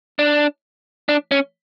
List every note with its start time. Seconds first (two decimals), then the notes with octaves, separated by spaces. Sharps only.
0.19 D4
1.09 D4
1.31 C#4